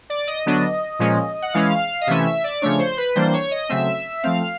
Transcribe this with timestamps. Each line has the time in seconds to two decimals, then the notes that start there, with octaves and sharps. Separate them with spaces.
0.10 D5
0.28 D#5
0.46 D3 F#3 B3 D4
0.99 A#2 F3 G#3 C#4
1.42 F#5
1.53 E3 G#3 C#4 F5
2.01 D#5
2.07 C3 E3 A3 C#4 E5
2.26 E5
2.44 D5
2.62 C#3 F3 A3 D4 C#5
2.79 C5
2.97 B4
3.15 E3 G3 A#3 D4 C5
3.28 C5
3.33 C#5
3.51 D#5
3.69 C#3 F#3 A3 C4 E5
4.23 F3 A3 C4 F5